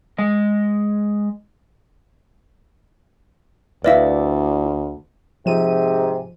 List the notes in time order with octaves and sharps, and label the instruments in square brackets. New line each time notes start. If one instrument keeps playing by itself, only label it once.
[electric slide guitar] G#3 D#5
[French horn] D2 [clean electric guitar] E4 D5 [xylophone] B4 E5 F5
[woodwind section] G#2 C3 [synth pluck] F3 D#7